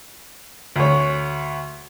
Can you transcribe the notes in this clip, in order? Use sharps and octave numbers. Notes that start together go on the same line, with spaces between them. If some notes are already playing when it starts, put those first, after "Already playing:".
D2 C#5